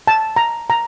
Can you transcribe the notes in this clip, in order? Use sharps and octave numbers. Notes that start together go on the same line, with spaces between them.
A5
A#5
A#5